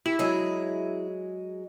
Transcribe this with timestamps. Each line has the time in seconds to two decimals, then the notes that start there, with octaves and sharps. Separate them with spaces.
0.06 E4 G4
0.19 F#3 G#3 G#4